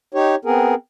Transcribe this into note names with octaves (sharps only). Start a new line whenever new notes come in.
D#4 G4 C#5
B3 C4 G#4 A#4